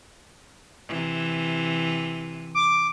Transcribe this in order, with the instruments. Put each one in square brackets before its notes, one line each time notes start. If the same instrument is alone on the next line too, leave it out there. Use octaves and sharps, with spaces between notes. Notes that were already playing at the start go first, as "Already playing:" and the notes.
[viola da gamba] C3 E3
[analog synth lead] D6